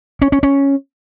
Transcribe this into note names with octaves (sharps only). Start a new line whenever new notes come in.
C#4
C#4
C#4